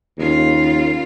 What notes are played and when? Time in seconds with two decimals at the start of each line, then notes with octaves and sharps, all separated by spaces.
0.18 D#2 C#3 F4